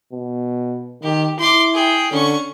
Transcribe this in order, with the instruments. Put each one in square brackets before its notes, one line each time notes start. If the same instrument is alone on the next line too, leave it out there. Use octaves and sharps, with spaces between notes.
[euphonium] B2
[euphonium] D#3 [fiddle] G4
[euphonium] E4 [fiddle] C6 D6
[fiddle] G#4 G5
[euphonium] D3 [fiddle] C#4 C#6